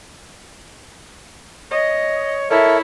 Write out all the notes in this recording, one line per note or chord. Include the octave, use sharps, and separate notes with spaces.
C#5 D#5
E4 A4 A#4 C#5 E5